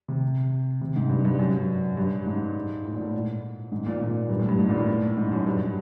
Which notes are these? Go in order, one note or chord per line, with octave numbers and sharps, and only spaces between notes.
C3
C3
G#2
G2
G2
F#2
G2
G#2
A2
A#2
A2
G#2
A#2
A#2
G2
A2
G2
G#2
A#2
A2
G#2
F#2
G2